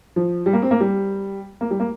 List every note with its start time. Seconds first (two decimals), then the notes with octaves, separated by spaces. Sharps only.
0.16 F3
0.46 G3
0.53 A#3
0.62 C4
0.71 A#3
0.80 G3
1.61 A#3
1.71 G3
1.80 A#3